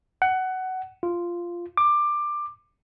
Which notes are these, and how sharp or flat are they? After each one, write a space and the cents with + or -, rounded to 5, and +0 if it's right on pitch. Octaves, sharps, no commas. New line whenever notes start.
F#5 +15
F4 -10
D6 +15